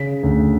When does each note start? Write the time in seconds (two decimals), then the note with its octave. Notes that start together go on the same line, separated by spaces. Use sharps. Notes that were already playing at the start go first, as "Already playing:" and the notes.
Already playing: C#3 B6
0.23 D2